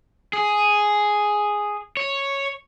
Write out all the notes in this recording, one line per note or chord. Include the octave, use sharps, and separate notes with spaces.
G#4
C#5